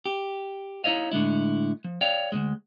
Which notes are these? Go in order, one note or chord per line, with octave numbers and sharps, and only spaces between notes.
G4
D#4 E4 C#5 D#5 F5
A2 D3 G#3 E4
F3
C#5 D5 F5 G5
D2 G#2 G#3